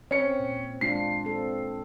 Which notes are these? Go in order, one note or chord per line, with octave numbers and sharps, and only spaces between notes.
C4 C#4 C#7
A#2
G#3 D4 F4 C7
C4 A4